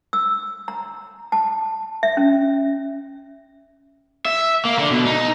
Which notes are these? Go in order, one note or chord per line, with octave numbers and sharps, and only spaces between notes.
E6
A#5
A5
E5
C#4
E5
A#3
D3
B2
D#4